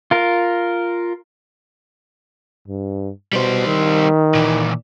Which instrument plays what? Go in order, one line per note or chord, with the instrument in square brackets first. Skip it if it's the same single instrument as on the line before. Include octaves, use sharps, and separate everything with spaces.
[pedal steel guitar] F4 A#4
[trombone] G2
[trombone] B2 [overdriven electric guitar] G3 C5
[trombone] D#3
[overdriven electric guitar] A#2 E3